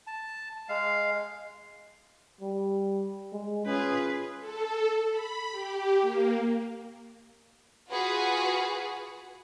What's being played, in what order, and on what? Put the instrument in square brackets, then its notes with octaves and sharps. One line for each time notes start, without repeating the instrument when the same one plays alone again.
[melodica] A5
G#3 F5
[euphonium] G3
G#3
[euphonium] C#4 [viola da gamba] F4 G#4 B4
[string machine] A4
B5
G4
A#3
[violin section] F4 F#4 G#4 B4